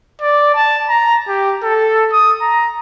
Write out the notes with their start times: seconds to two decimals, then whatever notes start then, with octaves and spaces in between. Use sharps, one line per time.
0.22 D5
0.55 A5
0.89 A#5
1.28 G4
1.63 A4
2.12 D#6
2.42 A#5